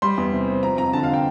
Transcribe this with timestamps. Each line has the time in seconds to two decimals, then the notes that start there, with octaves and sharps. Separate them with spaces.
0.02 G3 C6
0.18 E2
0.33 C3
0.48 C4
0.63 F3 A#5
0.78 F2 A#5
0.93 D3 A5
1.03 F5
1.14 G5